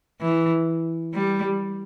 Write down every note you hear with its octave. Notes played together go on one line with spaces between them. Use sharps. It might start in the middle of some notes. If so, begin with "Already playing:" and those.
E3
G3